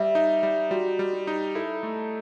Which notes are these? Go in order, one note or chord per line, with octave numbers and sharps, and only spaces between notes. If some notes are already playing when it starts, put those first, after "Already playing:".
Already playing: G3 E5
D#4
G3
G3 F#4
G3
G4
D#4
E4 A4
A3